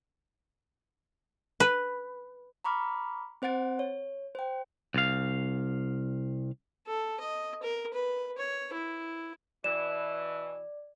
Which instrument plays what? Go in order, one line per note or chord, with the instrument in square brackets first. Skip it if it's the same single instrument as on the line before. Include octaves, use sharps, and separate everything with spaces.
[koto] B4
[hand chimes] A#5 B5 C#6 D6 F6
C4 C5 F#5 A6 D7
C#5
C5 G5
[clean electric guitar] C2 F5
[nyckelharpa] A4
D#5
A#4
B4
C#5
E4
[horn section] B2 E3 [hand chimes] D5 [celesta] E7